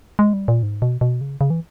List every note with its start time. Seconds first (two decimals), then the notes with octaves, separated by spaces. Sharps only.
0.19 G#3
0.33 G3
0.48 A#2
0.63 G#2
0.82 B2
1.01 B2
1.21 C#3
1.41 C#3
1.50 E3